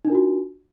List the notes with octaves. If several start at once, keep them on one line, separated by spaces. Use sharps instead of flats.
D4 D#4 F4 F#4 A#4